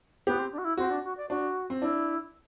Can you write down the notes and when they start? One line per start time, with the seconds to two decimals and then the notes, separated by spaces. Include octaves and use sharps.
0.27 B3 G4
0.39 C4
0.52 D4
0.58 F#4
0.65 E4
0.77 C4 F#4
0.90 D4
1.04 F#4
1.17 D5
1.30 D4 F#4
1.70 C4
1.81 D4 E4